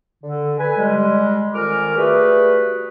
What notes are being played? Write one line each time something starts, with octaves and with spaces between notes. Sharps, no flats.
D3
B4 G#5
G3 G#3
F2 D#3 A#4 G#5 D6 F6
G3 A3 F#4 G#4 B4